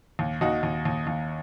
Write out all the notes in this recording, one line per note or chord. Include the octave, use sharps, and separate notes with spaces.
D#2
D#2 D#4 F#4
D#2
D#2
D#2